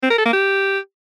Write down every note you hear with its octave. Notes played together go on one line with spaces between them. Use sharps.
C4
A#4
A4
A#3
G4